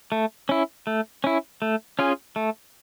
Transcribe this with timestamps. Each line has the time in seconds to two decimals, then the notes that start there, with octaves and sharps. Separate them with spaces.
0.12 A3
0.49 C#4 E4
0.87 A3
1.24 C#4 E4
1.62 A3
1.99 C#4 F4 G#4
2.36 A3